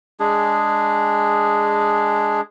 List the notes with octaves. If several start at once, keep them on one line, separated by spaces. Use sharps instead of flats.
G#3 D4 G#4